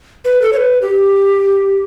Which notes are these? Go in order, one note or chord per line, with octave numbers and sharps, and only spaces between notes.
B4
A4
C#5
B4
G4